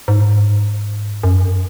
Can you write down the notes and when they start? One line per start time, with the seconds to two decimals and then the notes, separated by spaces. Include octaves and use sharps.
0.08 G#2
1.23 F#2